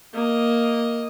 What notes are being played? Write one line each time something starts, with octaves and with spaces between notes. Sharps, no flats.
A#3 D#5